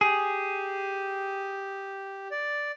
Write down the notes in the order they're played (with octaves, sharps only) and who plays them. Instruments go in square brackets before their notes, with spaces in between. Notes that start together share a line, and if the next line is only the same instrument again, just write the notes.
[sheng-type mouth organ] G4 [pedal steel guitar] G#4
[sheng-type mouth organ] D5